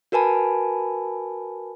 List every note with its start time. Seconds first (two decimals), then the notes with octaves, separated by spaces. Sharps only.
0.12 F#4 A#4 B4 G#5 A5 B5